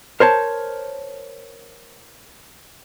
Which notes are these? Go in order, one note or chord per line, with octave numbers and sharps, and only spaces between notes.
A#4 C5 C#5 A5